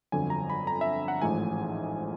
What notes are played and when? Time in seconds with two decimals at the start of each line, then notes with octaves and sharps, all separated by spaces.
0.12 G1 F2 D3 F#3 G#5
0.30 A#5
0.50 B5
0.67 A#5
0.81 E5
1.08 F#5
1.22 A1 G#2 F3 A3 G#5